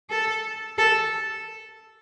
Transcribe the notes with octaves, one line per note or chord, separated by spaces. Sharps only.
A4
A4